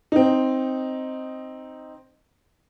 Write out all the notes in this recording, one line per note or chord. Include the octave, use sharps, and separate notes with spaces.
C4 D#4